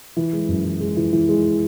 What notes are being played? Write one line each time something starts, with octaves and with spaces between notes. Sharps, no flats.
E3
G#3
F#2
E3
G#3
E3
E3
G#3